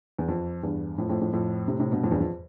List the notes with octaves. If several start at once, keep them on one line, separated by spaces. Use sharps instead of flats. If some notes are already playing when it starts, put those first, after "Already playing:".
E2
F2
E2 G2
F2 A2
F2 A2
F2 A2
F2 A2
A2 C3
A2 C3
G2 B2
F2 A2
E2 G2
F2